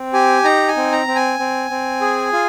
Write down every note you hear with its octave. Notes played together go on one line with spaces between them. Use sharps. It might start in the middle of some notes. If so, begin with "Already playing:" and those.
Already playing: C4
G4 G#5
D#4 A#5
G#5
C4
A#5
C4
G#5
C4
C4
G#4
F4